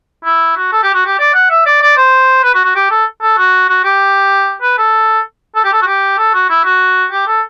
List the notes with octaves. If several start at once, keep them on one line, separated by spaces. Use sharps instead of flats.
E4
F#4
A4
G4
F#4
G4
D5
F#5
E5
D5
D5
C5
B4
F#4
F#4
G4
A4
A4
F#4
F#4
G4
B4
A4
A4
G4
A4
F#4
G4
A4
F#4
E4
F#4
G4
A4